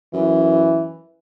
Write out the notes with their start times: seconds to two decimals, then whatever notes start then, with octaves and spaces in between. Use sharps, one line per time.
0.14 F#2 E3